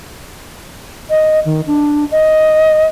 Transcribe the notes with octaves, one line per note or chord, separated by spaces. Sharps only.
D#5
D#3
D4
D#5